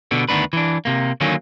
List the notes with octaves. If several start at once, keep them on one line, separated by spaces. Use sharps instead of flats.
B2 D3 B3
D2 D#3 B3 D4 B4
E3 D4
C3 A#3
D3 D#3 F#3 A#3 C#4